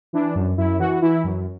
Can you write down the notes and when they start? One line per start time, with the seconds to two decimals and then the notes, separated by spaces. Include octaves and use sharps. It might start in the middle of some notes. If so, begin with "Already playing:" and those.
0.13 E3 D4
0.35 F#2
0.58 F#2 E4
0.79 E3 F#4
1.02 E3 E4
1.24 F#2